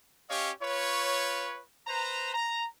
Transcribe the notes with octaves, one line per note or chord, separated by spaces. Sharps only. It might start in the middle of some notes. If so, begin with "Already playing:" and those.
C#4 G4 C#5 D#5 F5
F4 B4 C#5
B4 C5 A#5
A#5